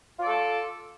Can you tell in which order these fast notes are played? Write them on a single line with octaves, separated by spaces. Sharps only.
F4 D5 A4